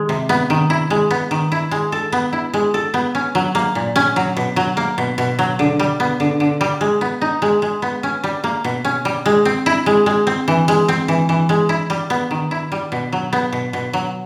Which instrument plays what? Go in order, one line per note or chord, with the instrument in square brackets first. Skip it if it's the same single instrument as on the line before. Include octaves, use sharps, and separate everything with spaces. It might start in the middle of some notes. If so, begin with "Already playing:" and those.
Already playing: [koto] D#3 G#3
C3
B3
D#3
E4
G#3
B3
D#3
E4
G#3
A4
B3
E4
G#3
A4
B3
C#4
F#3
A#3
A#2
C#4
F#3
B2
F#3
A#3
B2
B2
F#3
D3
G3
B3
D3
D3
G3
G#3
B3
D#4
G#3
G#3
B3
C#4
G3
A#3
B2
C#4
G3
G#3
C4
E4
G#3
G#3
C4
E3
G#3
C4
E3
E3
G#3
E4
G3
B3
D#3
E4
G3
B2
F#3
B3
B2
B2
F#3